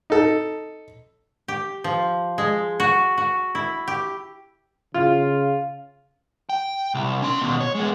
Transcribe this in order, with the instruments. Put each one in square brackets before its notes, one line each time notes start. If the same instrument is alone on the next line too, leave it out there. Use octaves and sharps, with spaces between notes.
[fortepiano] D#4 A4
[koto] G4
F3
G#3
F#4
F#4
E4
G4
[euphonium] C#3 [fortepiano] F4
[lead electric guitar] G5
C2
C#4 C6
D#2 B2
C#5
G#3 B3